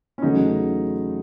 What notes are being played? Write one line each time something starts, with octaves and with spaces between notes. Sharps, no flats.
C#4
E2 C#3 F#3 A3 D#4